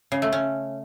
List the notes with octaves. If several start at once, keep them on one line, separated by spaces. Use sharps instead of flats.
C#3
A3
C#4